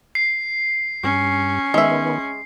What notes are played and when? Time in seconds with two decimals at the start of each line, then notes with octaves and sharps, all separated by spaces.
0.15 C7
1.03 G2 C#4
1.74 D#3 G#3 B3 E5